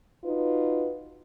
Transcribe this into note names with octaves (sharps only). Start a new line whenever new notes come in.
D#4 F4 F#4 B4